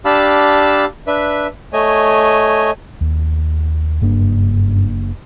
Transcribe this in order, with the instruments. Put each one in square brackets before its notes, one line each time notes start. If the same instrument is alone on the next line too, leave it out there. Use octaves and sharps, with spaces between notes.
[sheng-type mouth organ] D4 G4 F5 A5 B5 E6
D4 B4 E5
A3 C#5 D#5 G#5
[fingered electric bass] D#2
[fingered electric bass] F#1 A#3 D4 [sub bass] G2